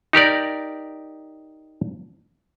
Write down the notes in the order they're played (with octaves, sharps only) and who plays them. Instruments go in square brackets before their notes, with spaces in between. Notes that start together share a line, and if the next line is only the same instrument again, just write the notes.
[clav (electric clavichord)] D#4 G4 A#4 D5